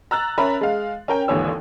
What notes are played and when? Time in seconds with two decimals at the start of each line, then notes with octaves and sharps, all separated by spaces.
0.11 A#5 E6 F#6 A6
0.38 C#4 A#4 E5 A#5 B5
0.61 G#3 F5
1.08 C#4 A#4 G5
1.28 G#1 D#2 D3 E3 C#5 E6